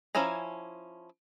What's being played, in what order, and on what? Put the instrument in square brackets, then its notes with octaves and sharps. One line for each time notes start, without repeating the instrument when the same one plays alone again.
[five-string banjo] F3 C#4 E4 G#5 A#5